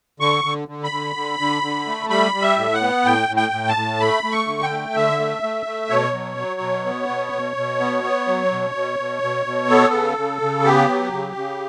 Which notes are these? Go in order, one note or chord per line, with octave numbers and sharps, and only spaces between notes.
D3 C#6
D3
D3
B5
D3
D3
D3
D3
A3
G3 B5
G3
E5
A2
F#5
B3
A2 G5
A2
G5
A2
A5
A2
A3 B5
A3
C#6
D3
G5
A3
D3 E5
A3
A3
A3
B2 C#5
F#3
F#3
B2
B3
B2
B2
B2
B3
B3
F#3
B2
B2
B2
B2
B2
B3 A4
C#3
C#3
C#3
B3 G4
F#3
C#3
C#3